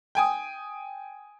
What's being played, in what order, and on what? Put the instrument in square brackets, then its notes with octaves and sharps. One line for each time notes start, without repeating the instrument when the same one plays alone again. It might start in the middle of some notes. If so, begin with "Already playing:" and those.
[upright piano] G5 G#5 D#6